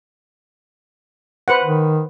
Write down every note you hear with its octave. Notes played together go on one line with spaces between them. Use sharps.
B4 C5 F#5
D#3